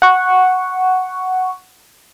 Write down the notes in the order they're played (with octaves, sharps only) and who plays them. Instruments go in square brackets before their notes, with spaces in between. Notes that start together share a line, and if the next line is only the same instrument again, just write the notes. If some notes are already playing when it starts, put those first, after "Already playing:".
[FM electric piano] F#5 C#6